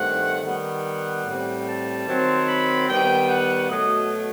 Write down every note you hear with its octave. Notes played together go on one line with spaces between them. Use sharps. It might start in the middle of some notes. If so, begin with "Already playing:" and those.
Already playing: G2 D#3 A3 C4 F#5
D#3 G3 B3 F#5
A2 G3 C4
A5
D#3 F#3 C4
B5
D#3 G3 B3 G5
F#5
B2 F#3 A3 D#5